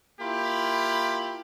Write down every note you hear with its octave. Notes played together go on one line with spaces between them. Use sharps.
A#3 E4 F4 G4 B5